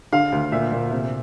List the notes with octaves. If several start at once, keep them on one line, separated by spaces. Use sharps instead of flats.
D3 F5
D2
A#2 E5
A#2
C3